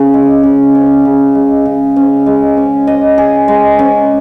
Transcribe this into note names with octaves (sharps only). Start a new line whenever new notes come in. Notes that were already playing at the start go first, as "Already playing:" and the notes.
Already playing: C#3 C#4
G#3
C#3
C#4
C#3
G#3
C#3
C#4
G#3
C#4
D#5
G#4
G#3
C#4